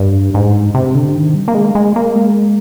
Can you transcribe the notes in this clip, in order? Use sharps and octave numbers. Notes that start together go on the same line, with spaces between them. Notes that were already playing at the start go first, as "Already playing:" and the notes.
Already playing: G2
G#2
C3
D3
D#3
G3
A#3
G#3
G#3
A#3
G#3